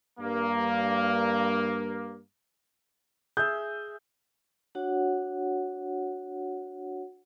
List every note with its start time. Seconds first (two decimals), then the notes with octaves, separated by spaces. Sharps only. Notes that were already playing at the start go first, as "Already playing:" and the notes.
0.19 G2 A#3
3.37 G#4 E5 G6
4.75 D4 F#4 C#5 F#5